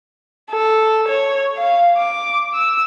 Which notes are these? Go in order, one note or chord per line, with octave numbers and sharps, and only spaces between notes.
A4
C#5
F5
D6
E6